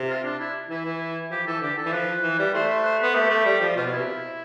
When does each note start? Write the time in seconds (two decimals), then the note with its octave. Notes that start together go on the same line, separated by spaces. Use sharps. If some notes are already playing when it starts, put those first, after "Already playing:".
Already playing: C3
0.08 F4
0.24 D4
0.39 E4
0.70 E3 E4
0.85 E3
1.30 F3 G4
1.46 E3 A4
1.62 D3 G4
1.77 A4
1.85 E3
1.93 F3 B4
2.23 E3
2.39 G3
2.54 A3 C5
2.69 B4
2.85 C5
2.99 B3 B4
3.15 A3 G4
3.30 A3
3.45 G3
3.61 F3
3.76 B2 F4
3.87 B2
3.91 E4
3.97 C3